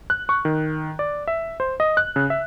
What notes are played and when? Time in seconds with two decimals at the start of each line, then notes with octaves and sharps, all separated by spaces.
0.10 F#6
0.29 C#6
0.45 D#3
0.99 D5
1.27 E5
1.60 C5
1.80 D#5
1.97 F#6
2.16 C#3
2.30 E5